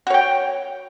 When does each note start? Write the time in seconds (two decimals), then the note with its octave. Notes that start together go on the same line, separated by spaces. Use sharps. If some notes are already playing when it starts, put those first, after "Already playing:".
0.07 F#4
0.10 C#5
0.14 G5